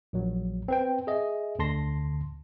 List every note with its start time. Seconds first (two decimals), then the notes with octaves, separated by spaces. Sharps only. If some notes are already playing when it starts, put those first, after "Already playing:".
0.13 A#1 F#3
0.68 C4 B4 G5
1.07 G#4 D#5 E5
1.59 D2 D3 A5 C6 A#6